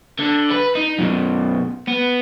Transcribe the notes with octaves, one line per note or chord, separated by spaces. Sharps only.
D3
B4
D#4
F#2 B2
B3